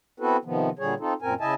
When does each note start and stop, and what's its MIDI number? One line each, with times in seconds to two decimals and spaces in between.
0.20 0.37 59
0.20 0.37 60
0.20 0.37 64
0.20 0.37 66
0.20 0.37 69
0.20 0.37 71
0.45 0.70 48
0.45 0.70 51
0.45 0.70 53
0.45 0.70 59
0.79 0.94 46
0.79 0.94 50
0.79 0.94 55
0.79 0.94 68
0.79 0.94 73
1.00 1.14 60
1.00 1.14 63
1.00 1.14 65
1.00 1.14 69
1.22 1.34 42
1.22 1.34 46
1.22 1.34 60
1.22 1.34 70
1.22 1.34 80
1.41 1.54 49
1.41 1.54 64
1.41 1.54 75
1.41 1.54 76
1.41 1.54 80
1.41 1.54 81